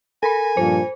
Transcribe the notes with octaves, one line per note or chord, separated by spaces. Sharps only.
A4 A#4 G#5 B5
G2 A#2 F3 C5